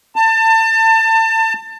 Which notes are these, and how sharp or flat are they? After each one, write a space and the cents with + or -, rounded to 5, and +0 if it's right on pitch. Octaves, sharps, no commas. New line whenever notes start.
A5 +30